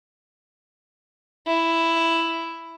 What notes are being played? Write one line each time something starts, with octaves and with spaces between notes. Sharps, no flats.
E4